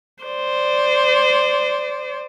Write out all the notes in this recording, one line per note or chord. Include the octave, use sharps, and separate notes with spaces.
C5 D5